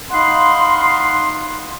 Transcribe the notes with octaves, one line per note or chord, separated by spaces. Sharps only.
D#4 F5 F#5 B5 C6